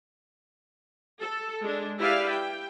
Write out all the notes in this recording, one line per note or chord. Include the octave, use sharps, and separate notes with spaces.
A4
G#3 D4
E4 G4 B4 D5 F5
G5